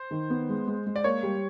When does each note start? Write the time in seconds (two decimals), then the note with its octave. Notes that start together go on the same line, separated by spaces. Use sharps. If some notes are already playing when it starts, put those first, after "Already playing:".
Already playing: C5
0.11 D#3
0.30 B3
0.49 G#3
0.67 G#3
0.86 G#3
0.96 D5
1.04 A#3 C#5
1.23 G3